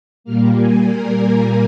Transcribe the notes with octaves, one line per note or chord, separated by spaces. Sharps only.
A#2 G3 A#3 F6
G#5
A#4